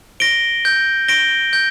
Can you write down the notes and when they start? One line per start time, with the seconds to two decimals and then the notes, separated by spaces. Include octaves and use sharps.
0.20 A#6 D7 G7
0.65 G6
1.08 A#6 D7 G7
1.53 G6